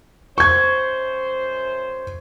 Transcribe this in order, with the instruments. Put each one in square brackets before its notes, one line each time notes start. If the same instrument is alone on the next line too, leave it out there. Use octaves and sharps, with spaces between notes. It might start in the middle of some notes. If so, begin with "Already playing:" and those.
[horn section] F#2 C5 [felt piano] C#6 G#6